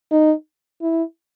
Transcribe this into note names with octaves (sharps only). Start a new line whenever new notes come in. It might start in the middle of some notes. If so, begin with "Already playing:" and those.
D#4
E4